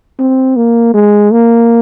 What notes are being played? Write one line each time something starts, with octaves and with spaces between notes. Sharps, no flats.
C4
A#3
G#3
A#3